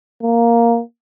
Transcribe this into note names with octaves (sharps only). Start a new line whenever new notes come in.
A#3